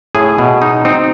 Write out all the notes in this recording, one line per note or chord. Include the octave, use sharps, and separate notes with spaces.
A2 G#4
B2
D#4
C4 D#4